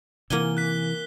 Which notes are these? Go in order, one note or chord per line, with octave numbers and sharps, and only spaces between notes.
C3 E3 A#3 F#5 G#5 G7
F#6 B6